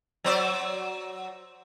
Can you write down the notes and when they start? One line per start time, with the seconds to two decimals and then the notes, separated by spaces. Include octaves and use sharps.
0.24 F#3 C5 D5